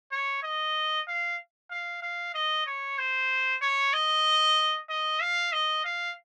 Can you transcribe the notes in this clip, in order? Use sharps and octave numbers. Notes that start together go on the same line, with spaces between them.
C#5
D#5
F5
F5
F5
D#5
C#5
C5
C#5
D#5
D#5
F5
D#5
F5